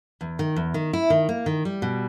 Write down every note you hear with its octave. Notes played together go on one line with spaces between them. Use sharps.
E2
D#3
E2
D#3
E4
D#3
A#3
D#3
G3
B2